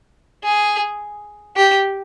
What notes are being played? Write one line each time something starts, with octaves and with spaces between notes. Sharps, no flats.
G#4
G4